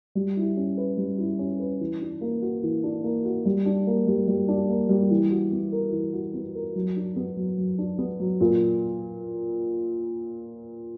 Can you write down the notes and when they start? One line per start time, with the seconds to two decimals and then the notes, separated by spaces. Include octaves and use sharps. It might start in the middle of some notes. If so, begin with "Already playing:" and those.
0.15 G3
0.37 E4
0.57 C#4
0.78 B4
0.97 G3
1.18 E4
1.39 C#4
1.60 B4
1.81 E3
2.01 D4
2.21 A#3
2.42 F#4
2.63 E3
2.84 D4
3.04 A#3
3.25 F#4
3.45 G3
3.66 D4
3.87 A#3
4.07 G3
4.28 G3
4.48 D4
4.69 A#3
4.89 G3
5.11 E3
5.31 F#4
5.52 B3
5.72 A#4
5.92 E3
6.13 F#4
6.34 B3
6.55 A#4
6.76 F#3
6.96 D4
7.16 B3
7.37 F#3
7.58 F#3
7.78 D4
7.99 B3
8.20 F#3
8.41 A#2